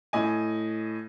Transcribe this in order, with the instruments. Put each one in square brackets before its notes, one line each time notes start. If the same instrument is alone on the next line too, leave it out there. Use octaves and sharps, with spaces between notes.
[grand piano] A2 D#5 G#5